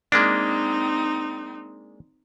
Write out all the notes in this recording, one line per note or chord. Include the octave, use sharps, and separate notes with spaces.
G#3 A#3 C4 D4 D#4